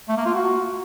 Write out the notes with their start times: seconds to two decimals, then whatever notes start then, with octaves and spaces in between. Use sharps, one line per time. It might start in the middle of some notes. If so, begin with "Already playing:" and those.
0.08 A3
0.17 A#3
0.25 F4
0.34 F#4